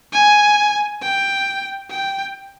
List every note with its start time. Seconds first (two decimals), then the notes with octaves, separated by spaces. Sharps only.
0.12 G#5
1.02 G5
1.90 G5